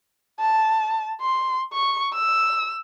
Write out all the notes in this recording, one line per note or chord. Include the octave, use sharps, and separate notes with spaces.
A5
C6
C#6
E6